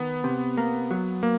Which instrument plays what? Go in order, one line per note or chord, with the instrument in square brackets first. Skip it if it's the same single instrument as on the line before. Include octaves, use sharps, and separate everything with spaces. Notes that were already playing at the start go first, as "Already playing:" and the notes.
Already playing: [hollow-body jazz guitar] D#3 [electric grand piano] B3
[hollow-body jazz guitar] C3
A#3
F#3
[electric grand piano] A#3